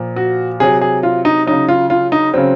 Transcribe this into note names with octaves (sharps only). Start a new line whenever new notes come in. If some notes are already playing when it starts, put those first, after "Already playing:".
Already playing: A#2 F3
F#4
C3 F#3 G#4
G#4
F4
D#4
C#3 F#3 D#4
F4
F4
D#4
C#3 F#3 C4